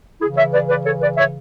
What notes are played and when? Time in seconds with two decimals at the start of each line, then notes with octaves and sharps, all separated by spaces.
0.21 C#3 E3 E4 G#4
0.36 C#5 E5
0.53 B4 D5
0.69 B4 D5
0.85 A4 C#5
1.01 B4 D5
1.17 C#5 E5